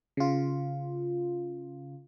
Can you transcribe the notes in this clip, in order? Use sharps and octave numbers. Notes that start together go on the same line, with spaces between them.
C#3 F4